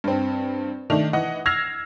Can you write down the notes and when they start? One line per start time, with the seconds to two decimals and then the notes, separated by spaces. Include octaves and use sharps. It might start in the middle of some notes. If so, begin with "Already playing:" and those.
0.04 G2 C4
0.90 D#3 A3 D4 F7
1.13 E3 D#5 F#5
1.46 E6 F6 G#6 A#6 C7 F7